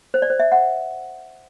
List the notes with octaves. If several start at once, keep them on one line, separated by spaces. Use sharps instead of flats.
C5
D5
C5
E5
F#5